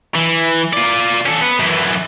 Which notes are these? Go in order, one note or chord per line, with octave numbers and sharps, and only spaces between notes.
E3
F4 D5
C#4 A4
B3
F#2 E3